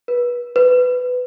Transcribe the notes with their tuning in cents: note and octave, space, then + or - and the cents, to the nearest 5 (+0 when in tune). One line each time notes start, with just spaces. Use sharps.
B4 -25
B4 +15